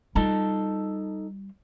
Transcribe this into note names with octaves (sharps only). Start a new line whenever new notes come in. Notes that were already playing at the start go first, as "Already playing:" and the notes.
G3 D#4 F4 A4 A5